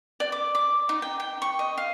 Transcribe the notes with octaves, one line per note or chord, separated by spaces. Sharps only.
D5
D6
D6
D#4
G5
G5
C#6
D#5
F5